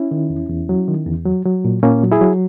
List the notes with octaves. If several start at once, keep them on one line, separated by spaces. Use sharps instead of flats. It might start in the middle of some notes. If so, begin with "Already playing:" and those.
Already playing: C#4 E4
D#3
E2
E2
F#3
D#3
E2
F#3
F#3
A#2
A#2 A#3 C#4
F#3
E4 G#4
F#3